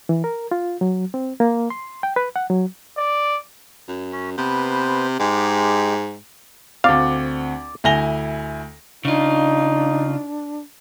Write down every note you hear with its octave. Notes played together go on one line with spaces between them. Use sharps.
E3
A#4
F4
F#3
C4
A#3
C6
G5
B4
F#5
F#3
D5
F#2
C#4
C3 B3 B4 C5
G#2 G#3 G4 D6
D2 C4 D5 F5
D2 E4 G#5 A#6 F7 G7
C#3 D4 D#4 F4